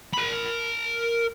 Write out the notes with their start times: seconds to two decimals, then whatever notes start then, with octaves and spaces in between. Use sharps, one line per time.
0.13 A#4 B5